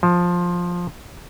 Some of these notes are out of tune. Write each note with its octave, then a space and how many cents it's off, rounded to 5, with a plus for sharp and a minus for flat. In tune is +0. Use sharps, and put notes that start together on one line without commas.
F3 +10